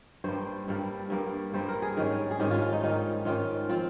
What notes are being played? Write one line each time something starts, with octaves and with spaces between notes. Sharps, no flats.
G2 G3 A#3 C5
G2 G3 A#3
G2 G3 A#3
G2 G3 A#3 C5
A#4
G#4
G#2 D#3 G3 C#4
G#4
G#2 D#3 G3 C#4 G4
F4
F4
D#4
G#2 D#3 G3 C#4 D#4
G#2 D#3 G3 C#4 F4
F3 C4 F4